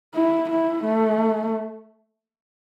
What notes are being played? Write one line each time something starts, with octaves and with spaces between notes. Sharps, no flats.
E4
E4
A3